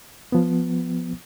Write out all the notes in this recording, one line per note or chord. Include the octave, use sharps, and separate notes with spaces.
F3 B3